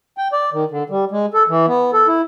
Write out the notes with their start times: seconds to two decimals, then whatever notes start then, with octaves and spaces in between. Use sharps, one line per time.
0.18 G5
0.32 D5
0.53 D#3
0.71 D3
0.90 G3
1.11 G#3
1.34 A4
1.49 E3
1.68 B3
1.93 A4
2.07 E4